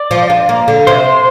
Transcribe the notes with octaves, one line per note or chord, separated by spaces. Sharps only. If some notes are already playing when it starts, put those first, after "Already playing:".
Already playing: D5
F3
D4
A#3
D3
C3 C5